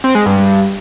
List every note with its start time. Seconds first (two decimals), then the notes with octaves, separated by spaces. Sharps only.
0.04 C4
0.15 G#3
0.26 G2